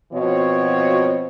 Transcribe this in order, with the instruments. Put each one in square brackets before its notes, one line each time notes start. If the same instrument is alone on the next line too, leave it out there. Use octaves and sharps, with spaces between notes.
[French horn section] B2 F3 C4 F#4 C#5